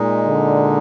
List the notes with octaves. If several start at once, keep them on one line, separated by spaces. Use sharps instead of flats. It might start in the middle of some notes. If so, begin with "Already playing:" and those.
Already playing: A#2 G#3 D#4
D3